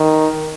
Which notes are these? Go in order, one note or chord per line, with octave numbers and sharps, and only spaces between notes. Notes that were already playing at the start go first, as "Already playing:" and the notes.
Already playing: D#3